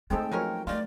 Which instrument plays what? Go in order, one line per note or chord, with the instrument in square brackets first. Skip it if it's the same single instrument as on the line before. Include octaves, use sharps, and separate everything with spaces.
[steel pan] G#3 C4 A4 [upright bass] A3 D#4 [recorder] G5
[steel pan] F3 F#3 C#5 [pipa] G#3 C#4 A#4
[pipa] D#3 F4 [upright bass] A3 A#3 [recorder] D5